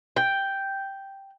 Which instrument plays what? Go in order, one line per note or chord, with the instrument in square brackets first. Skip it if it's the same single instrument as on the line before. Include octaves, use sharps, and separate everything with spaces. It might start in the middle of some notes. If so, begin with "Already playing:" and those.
[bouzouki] G5